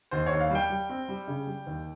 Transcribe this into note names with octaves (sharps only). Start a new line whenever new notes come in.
D#2 C5
C#5
D#2
F5
G3 G5
G3
C4
G3
C#3
G3
D#2